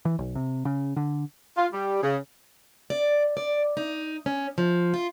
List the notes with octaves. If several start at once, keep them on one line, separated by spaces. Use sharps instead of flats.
E3
B1
C3
C#3
D3
F4
G3
C#3
D5
D5
D#4
C#4
F3
F4